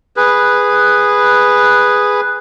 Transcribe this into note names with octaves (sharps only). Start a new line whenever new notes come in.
G#4 B4